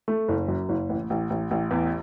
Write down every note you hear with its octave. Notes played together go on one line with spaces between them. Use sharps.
A3
F#1
F#2
F#1
A1
A1
A1
A1
E2